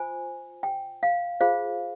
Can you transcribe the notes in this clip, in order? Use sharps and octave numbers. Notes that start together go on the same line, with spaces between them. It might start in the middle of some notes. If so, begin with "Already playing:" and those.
Already playing: F4 C5 G#5
G5
F5
F4 G#4 C5 F5